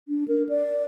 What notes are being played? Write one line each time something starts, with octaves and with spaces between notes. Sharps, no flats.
D4
A#4
D5